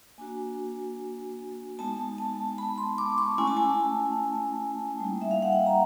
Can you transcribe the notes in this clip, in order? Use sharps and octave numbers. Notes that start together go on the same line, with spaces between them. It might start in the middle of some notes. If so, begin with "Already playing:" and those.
A#3 D4 F#4 G#5
G#3 B3 D#4 A5
A5
B5
C6
D6
C#6
A3 C#4 E4 G#5
A5
G#5
G3 A#3 D#4
E5
F5
F#5
G5
A#5